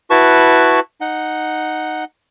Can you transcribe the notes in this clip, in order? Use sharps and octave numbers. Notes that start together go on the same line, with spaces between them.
E4 F#4 B4 A5 C#6
D#4 F#5